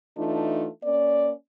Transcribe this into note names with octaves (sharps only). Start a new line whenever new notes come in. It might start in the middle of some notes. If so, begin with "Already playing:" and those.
E3 A3 D4 D#4 F4
A#3 C#4 D5